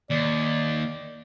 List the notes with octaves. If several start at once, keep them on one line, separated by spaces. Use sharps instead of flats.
D#2 D5